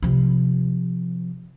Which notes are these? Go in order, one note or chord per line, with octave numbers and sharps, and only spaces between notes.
C3 F3